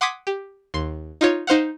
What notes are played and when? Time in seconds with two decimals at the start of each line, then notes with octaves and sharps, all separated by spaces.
0.01 F#5 C6 D6 D#6 G#6 B6
0.27 G4
0.74 D#2 C6
1.21 D#4 F4 C#5
1.47 D#4 C5 F5 F#5